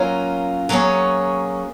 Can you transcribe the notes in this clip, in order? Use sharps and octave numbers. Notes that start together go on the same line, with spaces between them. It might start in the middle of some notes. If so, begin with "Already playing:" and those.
Already playing: F#3 A#3 C#4 F4 A#4
F#3 A#3 C#4 G#4 C#5